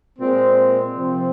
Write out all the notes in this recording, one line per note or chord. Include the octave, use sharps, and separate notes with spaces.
A#2 G#3 C4
C3 F3 C4